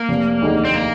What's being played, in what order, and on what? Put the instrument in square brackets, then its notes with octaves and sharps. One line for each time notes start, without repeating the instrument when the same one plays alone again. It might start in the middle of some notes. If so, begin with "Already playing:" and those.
Already playing: [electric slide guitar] A#3
[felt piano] F1
D#2 D3 G#3 D#4
[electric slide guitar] C4
A#3